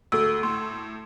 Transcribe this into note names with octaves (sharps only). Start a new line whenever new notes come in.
D2 A4 E6
A2 C6